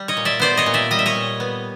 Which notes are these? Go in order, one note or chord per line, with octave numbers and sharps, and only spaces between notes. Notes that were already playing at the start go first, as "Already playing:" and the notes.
Already playing: G3
C#5 D#5
A#2
D5 E5
B3 C5 D5
C#5 D#5
A#2
D5 E5
G3 D#5
E5
C#5 D#5
A#2
B3